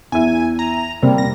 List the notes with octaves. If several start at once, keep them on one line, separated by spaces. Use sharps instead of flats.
E2 E5 G#5
A#5
C3 G3 A#3 C4
A#6